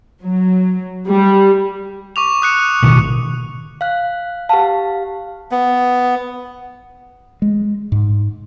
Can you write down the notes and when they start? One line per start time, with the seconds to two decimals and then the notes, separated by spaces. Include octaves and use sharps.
0.22 F#3
1.07 G3
2.16 C#6 D6 F7
2.42 D#6 F#6 C#7
2.82 A1 B2 D#3
3.81 F5 F#6
4.49 G4 B4 F5 F#5 A5
5.51 B3
7.42 G#3
7.92 G#2